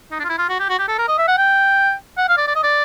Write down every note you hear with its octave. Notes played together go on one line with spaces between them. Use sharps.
D#4
D4
F4
E4
F4
F#4
G4
F#4
G4
A4
A#4
D#5
E5
F#5
G5
F#5
F5
D5
D5
D#5
D5